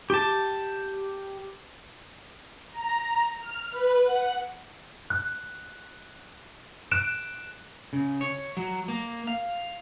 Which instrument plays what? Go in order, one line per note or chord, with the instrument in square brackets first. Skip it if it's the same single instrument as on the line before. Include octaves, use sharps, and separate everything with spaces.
[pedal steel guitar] G4 A5
[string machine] A#5
F6
B4
F#5
[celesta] F#6
F#6 D7 E7
[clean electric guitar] C#3
C#5
F#3
A#3
F5